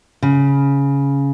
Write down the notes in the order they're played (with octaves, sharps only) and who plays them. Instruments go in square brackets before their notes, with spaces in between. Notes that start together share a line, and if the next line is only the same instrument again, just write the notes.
[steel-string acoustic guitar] C#3